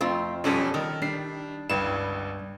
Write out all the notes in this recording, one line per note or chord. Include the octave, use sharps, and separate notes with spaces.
F2 A3 C4 F4
F#2 B2 F3 G3 C#4 A4
D#3 A4 A#4
G3 D4 C7
G1 C#2 G2 E7